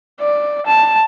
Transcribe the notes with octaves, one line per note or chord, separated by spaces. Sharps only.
D5
A5